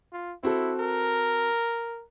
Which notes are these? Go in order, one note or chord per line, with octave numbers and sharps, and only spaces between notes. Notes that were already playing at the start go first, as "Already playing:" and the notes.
F4
C4 E4 F#4 A4
A#4